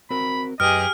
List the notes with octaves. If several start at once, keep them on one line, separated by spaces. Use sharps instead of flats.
C4 F#4 A#4 B5
F#2 G4 G#4 B4 D#5 F6